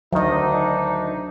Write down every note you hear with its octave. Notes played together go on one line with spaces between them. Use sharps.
D2 D#3 F#3 D4 D#4 D#5